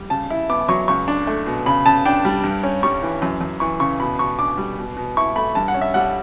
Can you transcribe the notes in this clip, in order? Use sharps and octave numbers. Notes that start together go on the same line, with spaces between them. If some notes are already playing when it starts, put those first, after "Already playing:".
Already playing: G3
C#3 A5
E4
B3 D6
F#3 C#6
C#2 C#6
D4
A3
B2
C#3 B5
C#3 A5
D4 G5
G3
G2
C#4
G3 C#6
E3
F#2
F#2
E3 C#6
C#3 C#6
B2 B5
B2 C#6
D4 D6
G3
B2
B2
E4 C#6
A3 B5
G2 A5
F#5
C#4
E5
G3 F#5